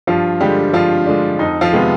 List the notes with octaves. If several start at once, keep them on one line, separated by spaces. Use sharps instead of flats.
G2 F3 F4
D3 G3 G#3 G4
G2 F3 F4
D3 G#3 D4
F2 D#4
F3 F4
C3 D#3 G#3 B3